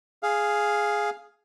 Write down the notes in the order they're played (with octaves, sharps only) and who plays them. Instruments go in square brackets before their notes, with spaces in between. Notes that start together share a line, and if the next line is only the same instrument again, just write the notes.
[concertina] G#4 F5